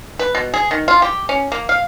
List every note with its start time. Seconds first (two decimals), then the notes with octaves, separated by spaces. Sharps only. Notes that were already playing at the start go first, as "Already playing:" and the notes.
0.19 B4
0.35 B2
0.54 G#4
0.71 D#3
0.88 F4
1.02 G4
1.29 C#4
1.52 A#3
1.69 F5